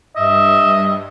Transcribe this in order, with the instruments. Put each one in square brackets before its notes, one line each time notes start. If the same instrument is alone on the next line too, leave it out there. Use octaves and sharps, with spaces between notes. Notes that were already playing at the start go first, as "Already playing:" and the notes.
[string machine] G2 [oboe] D#5 [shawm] E5